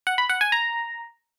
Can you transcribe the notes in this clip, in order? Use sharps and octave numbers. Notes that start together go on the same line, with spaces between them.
F#5
B5
F#5
G#5
A#5